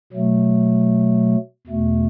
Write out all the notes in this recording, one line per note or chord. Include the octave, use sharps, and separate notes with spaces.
B2 F#3 A3
E2 B2 A3